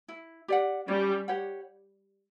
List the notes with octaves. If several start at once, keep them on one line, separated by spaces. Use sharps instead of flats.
E4
G4 D5 F#5
G3 C#4
G4 C#5 F#5